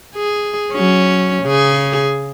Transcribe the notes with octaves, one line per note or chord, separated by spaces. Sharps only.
G#4
F#3 C#4
C#3 G#4